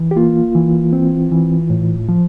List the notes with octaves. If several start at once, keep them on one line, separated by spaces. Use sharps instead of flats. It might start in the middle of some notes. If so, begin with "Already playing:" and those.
Already playing: E3
G4
A#3 F4
E3
C4
E3
A2
F3